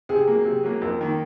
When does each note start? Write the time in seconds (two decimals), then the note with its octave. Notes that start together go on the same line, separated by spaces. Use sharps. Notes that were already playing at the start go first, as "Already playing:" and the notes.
0.09 C3 G#4
0.28 F#3 A#3
0.45 C3
0.63 F#3 A#3
0.81 F2 A#4
1.01 D#3 A#3